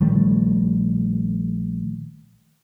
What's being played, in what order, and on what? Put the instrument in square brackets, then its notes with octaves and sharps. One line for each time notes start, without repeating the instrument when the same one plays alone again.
[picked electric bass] A#1 D#3 G3 A3